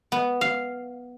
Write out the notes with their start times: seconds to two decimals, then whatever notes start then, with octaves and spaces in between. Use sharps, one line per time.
0.12 B3
0.41 F5